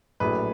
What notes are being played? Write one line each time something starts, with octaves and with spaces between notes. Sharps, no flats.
A#1 A2 F#3 B4